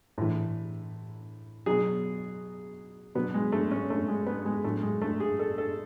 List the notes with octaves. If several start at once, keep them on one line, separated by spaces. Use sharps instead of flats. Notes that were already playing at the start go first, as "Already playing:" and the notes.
A2 E3
B2 F#3 G#4
B2 F#3 B3
G#3
A3
C#4
A3
G#3
B3
G#3
A2 F#3 A3
G#3
A3
G#4
A4
A4